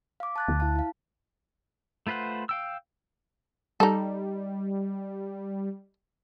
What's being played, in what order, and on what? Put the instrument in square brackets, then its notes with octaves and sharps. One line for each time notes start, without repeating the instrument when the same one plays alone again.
[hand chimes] F5 D6
A5 F#6 A6
[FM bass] D2
[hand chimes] E4 F5 A5
E4 F5
[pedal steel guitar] A3 F4 B4 C5 F#5
F5 G5 E6
[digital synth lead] G3 [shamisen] D#4 A4